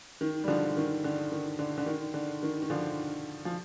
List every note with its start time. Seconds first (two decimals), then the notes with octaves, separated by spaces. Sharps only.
0.21 D#3
0.44 G3
0.48 D3 F3
0.77 D#3
1.04 D3
1.32 D#3
1.59 D3
1.78 D3
1.86 D#3
2.14 D3
2.43 D#3
2.62 D#3
2.70 D3 F3
3.45 F3